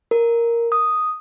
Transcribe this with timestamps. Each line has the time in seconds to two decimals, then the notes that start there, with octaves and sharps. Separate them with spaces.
0.11 A#4
0.72 D#6